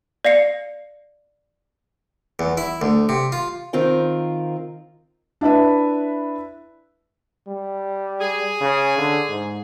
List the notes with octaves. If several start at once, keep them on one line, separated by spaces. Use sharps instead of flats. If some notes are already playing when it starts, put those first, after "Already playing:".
D5 F5 C7 C#7
E2
E4
D2
C3
F4
D#3 C4 F4 A#4
D4 E4 B4 E5
G3
G#4
C#3
D3
G#2